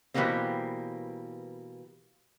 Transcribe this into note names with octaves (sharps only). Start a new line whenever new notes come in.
B2 E3 G3 A3 A#3 C4